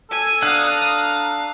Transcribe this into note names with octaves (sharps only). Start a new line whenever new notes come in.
A4 G#5
D4 F5 F#5 A#5 D#6